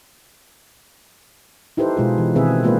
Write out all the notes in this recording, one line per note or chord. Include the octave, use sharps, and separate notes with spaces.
D#4 E4 G4 A4 B4 C5
B2 G#3 F4 G#4
E3
B2 D#3 C4 G#4 B4 E5
G#3 A#3 F4 B4 C5 D#5